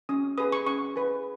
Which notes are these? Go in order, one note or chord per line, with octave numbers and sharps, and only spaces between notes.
C#4 D#6
G#4 B4 D#6
C#6
C#4 C#6
G#4 B4